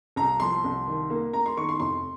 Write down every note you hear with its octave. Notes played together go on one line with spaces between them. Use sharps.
C2 A#5
F3 C6
C2
D#3
A#3
A#3 A#5
C6
D#3 C#6
C6
F1 C6